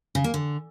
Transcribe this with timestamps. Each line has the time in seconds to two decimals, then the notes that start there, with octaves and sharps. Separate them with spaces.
0.15 C#3
0.24 A#3
0.34 D3